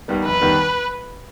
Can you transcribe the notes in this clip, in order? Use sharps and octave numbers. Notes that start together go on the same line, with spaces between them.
D#2 D#3 G3 B3
F1 B4
D#2 D#3 G3 B3